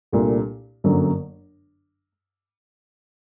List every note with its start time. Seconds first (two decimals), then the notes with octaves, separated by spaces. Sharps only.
0.13 C2 A#2 A3 D4
0.84 G1 F#2 D3 F#3 A#3